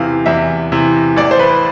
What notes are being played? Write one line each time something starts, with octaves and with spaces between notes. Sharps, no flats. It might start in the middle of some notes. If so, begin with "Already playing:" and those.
Already playing: E2 C3 E3 F5
E2 E5
C3 E3
A1 D5
C5
B4